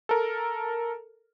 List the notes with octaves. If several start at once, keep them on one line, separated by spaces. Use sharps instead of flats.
A4 A#4